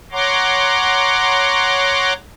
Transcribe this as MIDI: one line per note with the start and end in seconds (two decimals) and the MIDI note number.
0.12 2.13 73
0.12 2.13 78
0.12 2.13 82
0.12 2.13 84
0.12 2.13 86